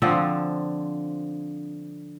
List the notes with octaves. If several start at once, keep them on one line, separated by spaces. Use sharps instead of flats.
D3 F3 C4 D4